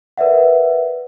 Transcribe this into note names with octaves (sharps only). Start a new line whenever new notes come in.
A#4 B4 D5 E5 F#5